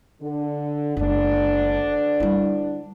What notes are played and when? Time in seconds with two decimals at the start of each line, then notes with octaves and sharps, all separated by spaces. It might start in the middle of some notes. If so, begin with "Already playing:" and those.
0.21 D3
0.97 F#1 D2 D3 G#3 D4
2.20 G3 E4